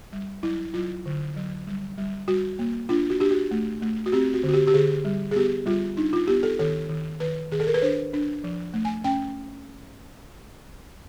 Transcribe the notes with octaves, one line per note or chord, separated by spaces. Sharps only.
G3
F#3 E4
F#3 F4
D3
F#3
G3
G3
G3 F#4
A#3
D4 F4
F#4
D4 G4
F#4
A3
A3
F#4
C4 G4
F#4
D3
F#4
G4
G4
D3 G#4
G3
G#4
B3 G4
G3 F4
D4 D#4
F4
B3 G4
A4
D#3 A4
D#3
D#3 B4
D#3 G#4
A4
A#4
B4
D4 C5
D4
F3
A3
G#5
C#4 G5